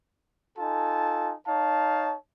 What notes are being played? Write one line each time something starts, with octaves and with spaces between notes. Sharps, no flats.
D#4 F4 A4 G#5 A5
D#4 C#5 F5 A5